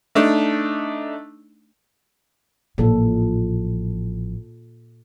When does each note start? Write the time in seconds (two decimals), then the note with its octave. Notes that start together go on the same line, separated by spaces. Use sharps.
0.15 A3 D4 D#4
2.78 A1 A#2 F3 A4